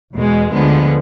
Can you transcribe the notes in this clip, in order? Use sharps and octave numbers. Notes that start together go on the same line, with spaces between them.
E2 B2 G#3
D2 D3 F3 G#3 B3